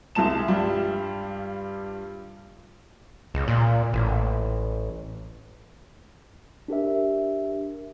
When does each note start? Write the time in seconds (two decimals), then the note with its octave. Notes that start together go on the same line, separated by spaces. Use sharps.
0.15 C2 G#3 A5 E7
0.47 G2 G3 F4
3.34 C#2
3.48 A#2
3.93 A1
6.68 D4 G4 A#4 E5